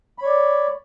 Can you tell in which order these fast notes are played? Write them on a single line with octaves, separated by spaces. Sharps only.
B5 C#5 D5